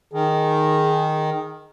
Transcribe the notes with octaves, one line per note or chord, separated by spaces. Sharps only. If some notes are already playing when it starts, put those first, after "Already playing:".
D#3 G#4